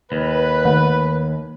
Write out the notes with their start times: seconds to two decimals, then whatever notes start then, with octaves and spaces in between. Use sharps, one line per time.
0.12 D#2 B4
0.65 D#3 A3